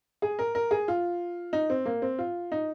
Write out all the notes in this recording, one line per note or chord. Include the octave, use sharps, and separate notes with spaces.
G#4
A#4
A#4
G#4
F4
D#4
C4
A#3
C4
F4
D#4